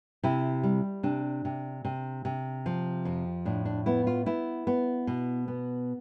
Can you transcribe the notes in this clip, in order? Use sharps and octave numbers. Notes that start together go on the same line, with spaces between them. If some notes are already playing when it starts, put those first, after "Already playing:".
C3 E4
G3
C3 D4
C3
C3
C3
F3
F2
A2 D4
D4
B3 E4
F4
B3 E4
B3
B2
B3